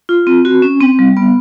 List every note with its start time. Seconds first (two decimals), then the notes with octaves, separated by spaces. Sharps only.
0.09 F4
0.27 C4
0.45 F#4
0.62 C#4
0.81 C4
0.99 G3
1.17 B3